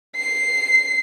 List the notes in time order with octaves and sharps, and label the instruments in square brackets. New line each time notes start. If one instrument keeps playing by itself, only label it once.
[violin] C7